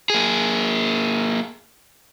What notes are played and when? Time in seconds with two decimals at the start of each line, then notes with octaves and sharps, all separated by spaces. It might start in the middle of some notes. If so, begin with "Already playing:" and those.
0.10 A#3 G#4